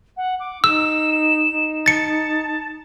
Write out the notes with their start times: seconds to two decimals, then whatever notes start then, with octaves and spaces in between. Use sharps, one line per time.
0.17 F#5
0.40 D6
0.64 D#4 E6 E7
1.50 D#4
1.86 A5 A6 C#7